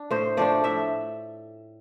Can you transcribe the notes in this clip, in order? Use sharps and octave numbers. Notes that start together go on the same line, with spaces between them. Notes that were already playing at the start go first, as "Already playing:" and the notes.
Already playing: D4
A2 C5
F3 A3 D4 D5
A2 E5